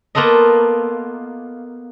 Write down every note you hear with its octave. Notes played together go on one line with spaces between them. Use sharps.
A#3 B3 F4 A4 D#5